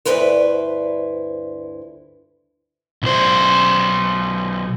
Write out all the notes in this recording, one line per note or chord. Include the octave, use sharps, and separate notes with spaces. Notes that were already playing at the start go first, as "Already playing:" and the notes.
D2 G2 E4 B4 C5
B1 C5